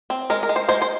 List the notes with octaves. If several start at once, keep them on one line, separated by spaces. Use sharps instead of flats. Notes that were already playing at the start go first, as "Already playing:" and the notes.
C4
G#3 A#4
A#4
G#3
C5
G#3 C5
C5